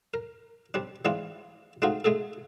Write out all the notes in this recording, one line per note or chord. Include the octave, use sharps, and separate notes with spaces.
A#4
G3 C4 D4
E3 G#3 C4 D4 F4
G#3 A3 C4 D#4 F4 F#4
G#3 A3 G#4 A4